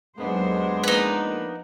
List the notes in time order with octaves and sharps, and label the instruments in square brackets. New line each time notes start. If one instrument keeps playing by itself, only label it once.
[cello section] D#2 F#3 C5 [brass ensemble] G#3 [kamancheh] B3 D4
[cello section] F3 A#3 [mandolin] D#4 B4